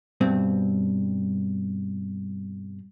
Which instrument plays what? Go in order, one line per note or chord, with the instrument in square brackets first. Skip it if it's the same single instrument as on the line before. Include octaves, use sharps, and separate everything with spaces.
[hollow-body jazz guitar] G2 B2 C4